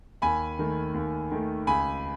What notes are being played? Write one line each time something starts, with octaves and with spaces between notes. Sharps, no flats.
D#2 G#5 B5
D#3 A3
D#2
D#3 A3
C#2 G#5 B5